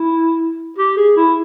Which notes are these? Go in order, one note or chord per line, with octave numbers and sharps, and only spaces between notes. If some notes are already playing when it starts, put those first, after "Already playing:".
Already playing: E4
G4
G#4
E4